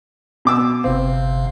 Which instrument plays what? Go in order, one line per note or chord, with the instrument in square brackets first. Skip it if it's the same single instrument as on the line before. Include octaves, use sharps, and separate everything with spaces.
[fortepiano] B2 D6 E6
[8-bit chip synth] G1 C3 F5 [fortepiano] C4